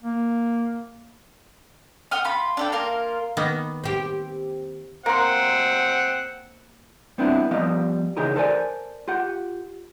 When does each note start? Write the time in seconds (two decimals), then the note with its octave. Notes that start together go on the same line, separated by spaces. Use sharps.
0.03 A#3
2.11 F#5 G5 D#6 F6
2.24 F4 B5
2.57 D4 A4 G5
2.72 A#3 F4 A#4
3.37 D#3 A#3 B3
3.84 C4 G4
5.06 A#3 C4 F#5 C6
7.18 G3 B3 C4 D4 E4 F4
7.51 F3 G3 B3 D#5 F5
8.17 C#3 E3 D#4 G4 G#4 A#4
8.36 A4 A#4 C5 D5 G5 G#5
9.08 F4 G4 F#5